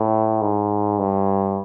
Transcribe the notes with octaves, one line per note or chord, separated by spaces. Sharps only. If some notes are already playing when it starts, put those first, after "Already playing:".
Already playing: A2
G#2
G2